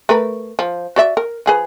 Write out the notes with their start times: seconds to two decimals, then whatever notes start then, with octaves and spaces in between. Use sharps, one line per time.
0.09 A3 A#4 B4
0.59 F3
0.96 F#4 D5 E5
1.17 A#4
1.46 F3 G#4 B4